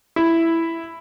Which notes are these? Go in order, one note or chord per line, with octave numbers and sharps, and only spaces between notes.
E4